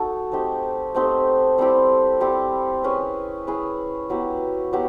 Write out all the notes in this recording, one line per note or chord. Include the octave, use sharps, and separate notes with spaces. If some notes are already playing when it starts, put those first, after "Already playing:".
Already playing: D#4 F#4 A4
A3 C4 D#4 G4
A3 C4 D#4 G4
G3 C4 E4 G4
G3 C4 E4 G4
C#4 E4 G#4 B4
C#4 E4 G#4 B4
F#3 B3 E4 G4
F#3 B3 E4 G4